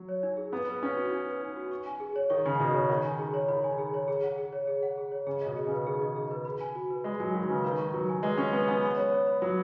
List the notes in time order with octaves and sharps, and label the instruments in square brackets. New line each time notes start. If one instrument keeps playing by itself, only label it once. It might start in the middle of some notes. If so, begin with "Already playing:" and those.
Already playing: [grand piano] F#3
[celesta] C#5
D#4
G#4
[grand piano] B3 [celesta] D#4
[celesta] B4
[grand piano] C#4 [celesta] D#4
[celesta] F#4
D#4
B4
D#4
F#4
C#6
G#5
G#4
C#5
[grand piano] D#3 [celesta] C#6
[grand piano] C#3 [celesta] G#5
[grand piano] B2 [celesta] G#4
[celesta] C#5
[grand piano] D#3 [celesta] B5
[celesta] G#5
G#4
C#5
[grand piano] D#3 [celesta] B5
[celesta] G#5
G#4
C#5
G#4
F#5
G#4
C#5
G#4
F#5
G#4
C#5
[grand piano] C#3 [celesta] G#4
[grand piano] B2 [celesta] D#5
[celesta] G#4
[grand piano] C#3
[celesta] B4
[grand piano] D#3 [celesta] G#4
[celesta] D#5
G#4
B4
B5
G#5
F#4
B4
[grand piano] G#3 [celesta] B5
[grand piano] F#3 [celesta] G#5
[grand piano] D#3 [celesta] F#4
[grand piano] C#3 [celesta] B4
[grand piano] D#3 [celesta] B4
[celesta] C#6
[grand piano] F#3 [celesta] B4
[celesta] G#5
[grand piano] G#3 [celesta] B4
[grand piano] C#4 [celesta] C#6
[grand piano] B3 [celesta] B4
[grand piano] B3 [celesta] G#5
[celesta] B5
C#5
C#5
B5
[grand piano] F#3 [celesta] B5